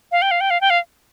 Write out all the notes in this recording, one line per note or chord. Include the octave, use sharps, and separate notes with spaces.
F5
G5
F5
G5
F5
G5
F5